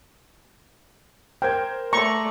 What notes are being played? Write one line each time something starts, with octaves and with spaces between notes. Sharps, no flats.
A#4 C5 G5 G#6
A3 D5 A#5 C6 C#6